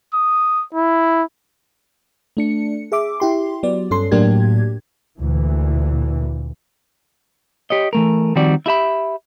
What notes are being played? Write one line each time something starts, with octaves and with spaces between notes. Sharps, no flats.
D#6
E4
A3 D4 C#7
G#4 E5 D6
E4 G4 C6
F#3 B3 D5
G2 C#4 A4 C6
A2 F#3 A#3 D4 G4 G#6
D2 A#2 E3
G4 C#5 D#5
E3 A3 A#4
D#3 F3 G3 C4 F#4 D5
E4 G4 E5 B5